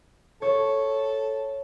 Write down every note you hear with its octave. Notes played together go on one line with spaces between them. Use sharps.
A4 C#5